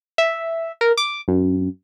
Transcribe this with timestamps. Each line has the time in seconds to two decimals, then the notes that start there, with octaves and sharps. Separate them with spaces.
0.18 E5
0.81 A#4
0.97 D6
1.28 F#2